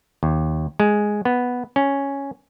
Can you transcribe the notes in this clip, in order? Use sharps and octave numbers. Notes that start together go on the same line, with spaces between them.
D#2
G#3
B3
C#4